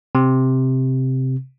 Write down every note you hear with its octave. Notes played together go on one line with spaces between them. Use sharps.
C3